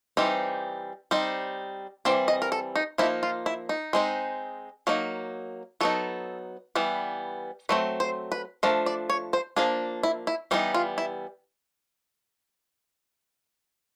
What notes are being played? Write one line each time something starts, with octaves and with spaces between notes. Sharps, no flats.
E3 G3 C4 D#4
G3 C4 D#4
E3 G3 C4 D5
D#5
A#4
A4
D#4
F3 A#3 D#4 E4
F4
E4
D#4
G#3 C4 D#4
F#3 A#3 D#4
F#3 B3 D#4 A4
E3 G3 B3
F#3 A3 C4 B4
C5
B4
F3 A3 D4 A#4
D5
C#5
C5
F3 A#3 D4 G#4
E4
E4
E3 G3 B3 D#4
F4
E4